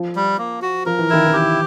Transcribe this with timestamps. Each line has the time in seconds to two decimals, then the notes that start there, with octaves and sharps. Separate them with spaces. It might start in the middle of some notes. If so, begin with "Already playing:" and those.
Already playing: F3
0.15 G3
0.38 A#3
0.62 F#4
0.86 F3 A#4
0.99 E3
1.10 D#3 E4
1.26 E3
1.33 G4